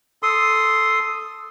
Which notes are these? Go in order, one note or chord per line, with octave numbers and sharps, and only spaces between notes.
A4 C6 D#6